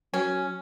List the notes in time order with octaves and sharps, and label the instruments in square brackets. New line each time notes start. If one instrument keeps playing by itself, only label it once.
[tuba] F#3 [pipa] C#4